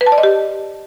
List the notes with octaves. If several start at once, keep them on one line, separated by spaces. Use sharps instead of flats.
B4
A5
D5
D#5
G4